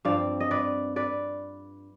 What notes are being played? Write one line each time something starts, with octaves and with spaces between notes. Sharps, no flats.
G2 F3 C4 D5 F5
D#5
B4 D5
B4 D5